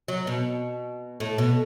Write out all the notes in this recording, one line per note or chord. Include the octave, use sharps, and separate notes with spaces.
F#3
B2
A2
B2